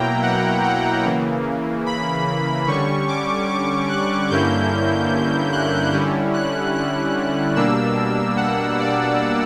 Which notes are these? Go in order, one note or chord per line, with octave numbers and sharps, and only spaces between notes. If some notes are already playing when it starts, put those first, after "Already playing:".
Already playing: B2 F#3 A#3 E4 G5 A#5
F#5
F#5
C#3 E3 A#3
B5
D3 G3 C#4 C#6
D6
D6
F#6
G2 D3 A#3 C#4 E4 G6
F#6
D3 G3 C#4 E4
F#6
F#6
B2 G3 A#3 D4 E6
F#5
D5